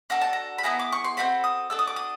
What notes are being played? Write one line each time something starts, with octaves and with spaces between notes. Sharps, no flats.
D4 F#4 A4 A#5
A5
A#5
B5
B3 E4 G#4 A#5
D6
C#6
C6
C4 D#4 F#4 A4 B5
D#6
D4 F#4 A4 E6
D#6
D6
D#6